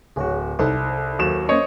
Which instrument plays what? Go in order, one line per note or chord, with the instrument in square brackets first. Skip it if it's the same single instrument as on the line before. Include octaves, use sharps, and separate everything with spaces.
[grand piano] D1 F#4 [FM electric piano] G#4 C#5
[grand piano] C2 [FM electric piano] D#4 A4 C5
[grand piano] D#2 F#3 E7
[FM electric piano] A#3 C#4 [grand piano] C5 C#5 D#5